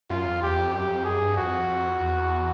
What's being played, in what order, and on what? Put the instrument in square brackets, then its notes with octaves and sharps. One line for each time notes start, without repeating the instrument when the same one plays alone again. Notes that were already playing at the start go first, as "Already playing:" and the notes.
[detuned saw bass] F#2 [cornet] F4
[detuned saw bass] F2
[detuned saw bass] E2 [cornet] G4
[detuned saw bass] F2
[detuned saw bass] F#2 [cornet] G4
[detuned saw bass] F2
[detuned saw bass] F#2 [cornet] G#4
[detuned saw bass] G2
[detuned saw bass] F2 [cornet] F#4
[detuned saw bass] F2
E2